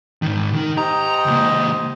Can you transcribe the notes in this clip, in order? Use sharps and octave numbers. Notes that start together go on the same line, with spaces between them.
G#2 D#3
D#3 D#4
G#2 G4 D#5 A#5
C#2 A#3